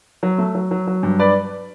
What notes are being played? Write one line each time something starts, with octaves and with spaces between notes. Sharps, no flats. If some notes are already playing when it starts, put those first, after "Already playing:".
F#3
A3
F#3
F#3
F#3
G2
B4 D5